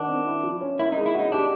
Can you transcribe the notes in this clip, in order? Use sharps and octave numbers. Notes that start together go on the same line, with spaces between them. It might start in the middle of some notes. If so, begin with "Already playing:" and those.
Already playing: D#3 D4 D#4 F#4
C4
E4
F3
C#4
E4 A#4
D#4
G#3
E4
D#4 F#4
D4 G4